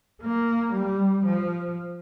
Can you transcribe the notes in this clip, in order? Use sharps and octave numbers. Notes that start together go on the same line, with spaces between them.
A#3
G3
F3